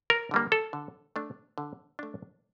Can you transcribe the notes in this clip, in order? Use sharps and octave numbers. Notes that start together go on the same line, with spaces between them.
A#4
D3 G3 A#3
A4
D3
A3 D4
D3
A3 D4